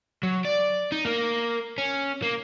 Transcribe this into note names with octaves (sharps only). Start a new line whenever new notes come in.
F#3
D5
D#4
A#3 A#4
C#4
A#3